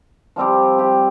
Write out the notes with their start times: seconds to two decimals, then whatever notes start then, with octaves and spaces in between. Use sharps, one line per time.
0.36 F3 G3 C4 G4
0.79 G4